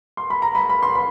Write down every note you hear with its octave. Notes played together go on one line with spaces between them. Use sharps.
C6
B5
A#5
B5
B5
C6
B5